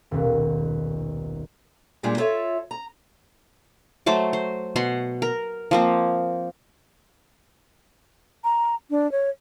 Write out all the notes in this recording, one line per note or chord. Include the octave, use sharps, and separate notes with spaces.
D#1 B1
A#2 G3 G#3 D4 F4 G#4
E4 F4 A4 C#5 E5
A#5
F#3 A3 C5 D6
C5
B2 F#5 C6
A#4
F3 A#3 C4
A#5
D4
C#5